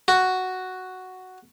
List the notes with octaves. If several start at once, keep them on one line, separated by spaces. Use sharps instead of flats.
F#4